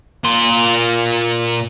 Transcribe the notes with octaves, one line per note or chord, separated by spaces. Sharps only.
A#2 C6